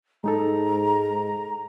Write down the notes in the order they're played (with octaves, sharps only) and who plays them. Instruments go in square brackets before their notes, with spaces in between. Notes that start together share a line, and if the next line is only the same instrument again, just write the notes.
[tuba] G#2 [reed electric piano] G#3 D#4 A4 [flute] A#5